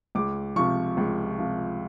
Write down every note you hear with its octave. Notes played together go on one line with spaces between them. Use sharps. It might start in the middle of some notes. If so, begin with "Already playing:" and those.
C#2 D6
C3 F3 C#6
C#2
C3 F3